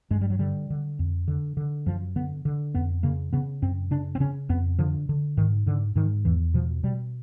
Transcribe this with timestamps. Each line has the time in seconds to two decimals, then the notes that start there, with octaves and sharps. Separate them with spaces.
0.11 G2 G#3
0.21 G3
0.30 F#3
0.39 D3 G3
0.70 D3
0.99 F2
1.28 D3
1.57 D3
1.86 F#2 F3
2.16 D3 B3
2.45 D3
2.75 F2 B3
3.03 C#3 A#3
3.33 C#3 B3
3.62 F#2 C4
3.91 C#3 D4
4.15 C4
4.20 C#3 C#4
4.49 F2 B3
4.79 D3 F3
5.09 D3
5.37 G#2 D#3
5.66 G#2 D3
5.96 G#2 D#3
6.25 E2 E3
6.54 B2 F3
6.83 B2 G3